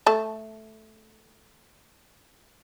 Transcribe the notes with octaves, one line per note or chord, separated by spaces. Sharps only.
A3 A5